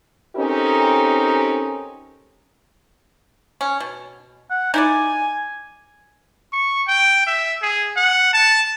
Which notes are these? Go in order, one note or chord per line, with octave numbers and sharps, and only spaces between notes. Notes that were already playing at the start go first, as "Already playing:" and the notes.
C4 C#4 D#4 G4 A4 A#4
C#4
B2
F#5
D#4 E4 D5 G#5
C#6
G5
E5
G#4
F#5
A5